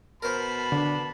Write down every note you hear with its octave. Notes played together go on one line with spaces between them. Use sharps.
B2 A#4 C5 A5 B5
D3 D4